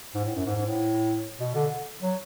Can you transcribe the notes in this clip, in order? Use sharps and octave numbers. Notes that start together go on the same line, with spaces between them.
G#2
A2
F#2
G#2
G#2
A2
B2
D3
F#3